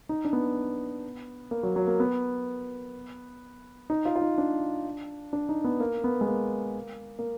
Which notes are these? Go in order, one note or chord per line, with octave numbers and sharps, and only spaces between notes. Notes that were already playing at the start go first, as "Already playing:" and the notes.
D#4
D4
B3
A#3
F#3
F#3
A#3
B3
D#4
F4
F4
D#4
D4
D4
D#4
B3
A#3
B3
G#3
A#3
A#3